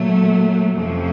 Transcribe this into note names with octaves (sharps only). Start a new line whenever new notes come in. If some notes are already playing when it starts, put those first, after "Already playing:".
Already playing: A#2 F#3 A3
F2 C3 F3 A3 C#4